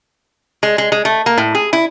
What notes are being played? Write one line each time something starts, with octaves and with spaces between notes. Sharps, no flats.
G#3
G#3
G#3
A3
A#3
A2
G#4
E4